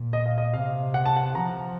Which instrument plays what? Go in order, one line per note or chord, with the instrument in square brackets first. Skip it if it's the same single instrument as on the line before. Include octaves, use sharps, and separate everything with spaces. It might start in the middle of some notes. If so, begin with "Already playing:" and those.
Already playing: [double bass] A#2
[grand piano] D#5
F5
D#5
[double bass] C3 [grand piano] F5
[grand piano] F#5
A5
F#5
[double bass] F3 [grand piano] A#5